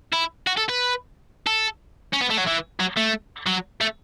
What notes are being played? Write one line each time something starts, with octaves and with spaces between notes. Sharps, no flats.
E4
F#4
A4
B4
A4
C#4
B3
A3
F#3
E3
F#3
A3
F#3
A3